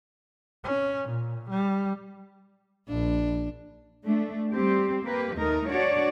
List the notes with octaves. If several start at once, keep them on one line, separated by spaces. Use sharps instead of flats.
C#4
A#2
G3
A#1 D4
A3 D4
G3 C4 G4
A#3 G4 B4
D#2 A3 D#4 A#4
D4 F#4 C#5 D5